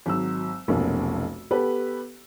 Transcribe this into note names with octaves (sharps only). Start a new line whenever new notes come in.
G#1 F#3 E6
F1 B1 A#3 C#4
B3 G4 A4 B4